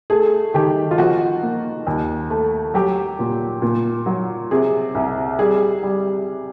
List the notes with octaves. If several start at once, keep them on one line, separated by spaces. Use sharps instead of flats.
A3 G#4
D#3 G4
F4
F3 F#4
A#3
D#2
A3
F#3 G4
A#2
A#2
F#3
C3 G#4
C2
G3 G#4
G3